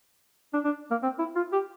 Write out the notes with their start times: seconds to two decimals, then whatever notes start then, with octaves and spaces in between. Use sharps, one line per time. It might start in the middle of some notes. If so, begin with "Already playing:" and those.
0.54 D4
0.65 D4
0.91 A#3
1.03 C4
1.19 E4
1.36 F4
1.52 G4